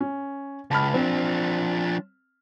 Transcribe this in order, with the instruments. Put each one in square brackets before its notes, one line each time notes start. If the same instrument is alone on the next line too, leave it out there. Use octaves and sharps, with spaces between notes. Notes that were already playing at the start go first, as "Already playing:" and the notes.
[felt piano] C#4
[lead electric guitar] C#2 [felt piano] A5 B5 F6
[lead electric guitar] F3 D4 [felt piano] C4